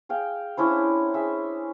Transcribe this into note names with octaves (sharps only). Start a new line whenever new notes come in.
G#4 F5 G5
C#4 D4 E4 C5
G#4 E5